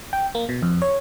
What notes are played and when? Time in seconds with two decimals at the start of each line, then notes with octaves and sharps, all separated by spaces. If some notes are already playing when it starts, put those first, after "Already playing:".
0.13 G5
0.35 A#3
0.49 B2
0.62 F2
0.82 C#5